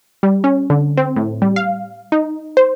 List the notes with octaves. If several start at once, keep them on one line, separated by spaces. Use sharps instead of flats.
G3
C#4
D3
C4
A2
G3
F5
D#4
C5